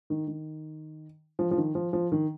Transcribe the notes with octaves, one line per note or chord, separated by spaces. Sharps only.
D#3
D#3
F3
F3
D#3
F3
F3
D#3